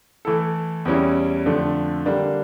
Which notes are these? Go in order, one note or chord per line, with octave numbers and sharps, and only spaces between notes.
E3 A3 E4 A4
E2 E3 G3 C#4 E4
F2 D3 F3 A3 D4
D3 G3 A#3 D4